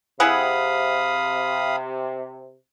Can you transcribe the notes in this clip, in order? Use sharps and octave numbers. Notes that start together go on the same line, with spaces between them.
C3 E4 G#4 F5 F#5 B5 D#6